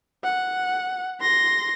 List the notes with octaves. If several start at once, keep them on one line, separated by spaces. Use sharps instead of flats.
F#5
C6 A#6